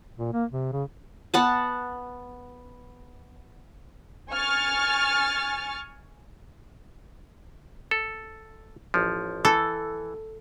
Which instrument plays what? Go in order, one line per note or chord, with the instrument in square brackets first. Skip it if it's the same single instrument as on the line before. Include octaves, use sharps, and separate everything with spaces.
[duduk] A#2
A#3
C3
C#3
[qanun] B3 F#5 A5
[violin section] G#5 C#6 F6 A6
[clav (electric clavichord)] A4
A1 F3
[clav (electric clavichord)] E3 [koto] A4